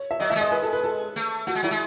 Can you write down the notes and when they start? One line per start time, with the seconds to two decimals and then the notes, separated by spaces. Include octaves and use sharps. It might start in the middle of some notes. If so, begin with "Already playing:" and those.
Already playing: C#5
0.11 E5
0.20 F#3 D#5
0.30 A3 E5
0.36 G#3
0.41 D#5
0.51 B4
0.62 A4
0.73 B4
0.84 A4
1.16 A3
1.47 A3 F#4
1.55 G#3
1.63 F#3 E4
1.71 G#3